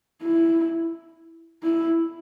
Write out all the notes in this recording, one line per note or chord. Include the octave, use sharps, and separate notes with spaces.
E4
E4